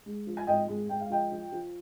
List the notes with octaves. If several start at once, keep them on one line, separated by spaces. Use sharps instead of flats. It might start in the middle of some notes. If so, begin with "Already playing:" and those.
G#3
F3
G#5
G#1 D#5 G5
G#3
G#3 G5
F5
F3 D#5 G5
F3
F3